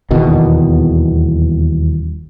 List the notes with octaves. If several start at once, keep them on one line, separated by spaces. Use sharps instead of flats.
D#1 E2 B2 D#3